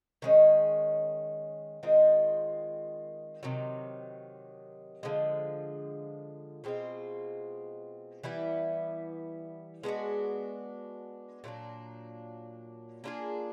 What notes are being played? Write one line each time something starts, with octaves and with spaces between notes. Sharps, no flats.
D#3 G#3 C#4
D#3 G#3 C4 F4
C3 D#3 F#3
D3 F3 G#3
B2 G#3 C4 F4
E3 G3 B3 E4
G#3 B3 D4 F#4
A#2 F#3 A#3 D4
A#3 D4 F4 G#4